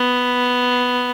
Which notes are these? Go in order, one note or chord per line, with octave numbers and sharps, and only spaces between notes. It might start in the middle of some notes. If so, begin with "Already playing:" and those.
Already playing: B3